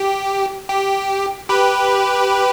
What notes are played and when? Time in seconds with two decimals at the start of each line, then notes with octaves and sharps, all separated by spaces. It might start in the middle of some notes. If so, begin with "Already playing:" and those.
Already playing: G4
0.69 G4
1.49 G4 B4